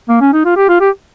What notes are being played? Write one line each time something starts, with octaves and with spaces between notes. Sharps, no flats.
A#3
C#4
D#4
F4
G4
F4
G4